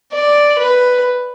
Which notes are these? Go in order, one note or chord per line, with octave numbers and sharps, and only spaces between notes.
D5
B4